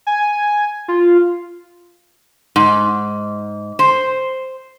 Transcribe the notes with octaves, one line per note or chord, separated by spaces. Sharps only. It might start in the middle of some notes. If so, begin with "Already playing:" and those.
G#5
F4
G#2
C5